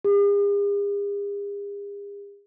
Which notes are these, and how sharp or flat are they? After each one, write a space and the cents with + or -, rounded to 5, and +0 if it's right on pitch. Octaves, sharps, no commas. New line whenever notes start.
G#4 -45